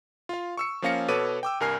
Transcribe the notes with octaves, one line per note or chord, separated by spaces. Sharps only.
F4 F5
C#6 E6 C#7
F3 A#3 C#4 F5 A#6 C#7
B2 A4 B4 C#5 D6 D#7
G5 D6 E6
C2 G2 A#4 G#5 F6 C7